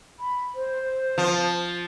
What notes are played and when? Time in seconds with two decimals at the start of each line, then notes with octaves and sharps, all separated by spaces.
0.19 B5
0.55 C5
1.18 F3